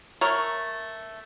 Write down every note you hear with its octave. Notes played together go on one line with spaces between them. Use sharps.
A3 A#4 C#5